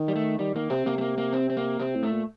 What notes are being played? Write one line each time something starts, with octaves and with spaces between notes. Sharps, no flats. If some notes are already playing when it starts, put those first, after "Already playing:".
Already playing: D#3
G3
A3
D#3 G3
D#3 A#3
C3 C4
C3 A#3
A3
A#3
A#3
C4
C4
A#3
C3 C4
A2
A3
A#2